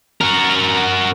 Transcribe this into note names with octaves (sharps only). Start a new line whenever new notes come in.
F#4 A#4